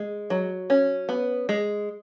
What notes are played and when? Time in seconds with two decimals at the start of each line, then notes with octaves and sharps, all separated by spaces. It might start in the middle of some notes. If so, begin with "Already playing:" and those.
Already playing: G#3
0.30 F#3
0.70 C#4
1.09 B3
1.49 G#3